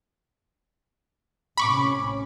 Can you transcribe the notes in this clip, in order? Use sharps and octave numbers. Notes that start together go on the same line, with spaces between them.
A2 C3 C#4 B5 C#6 D6